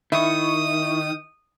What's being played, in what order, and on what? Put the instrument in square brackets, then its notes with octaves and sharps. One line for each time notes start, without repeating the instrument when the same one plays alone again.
[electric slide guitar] D#3 [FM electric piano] E4 C#6 [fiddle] D#6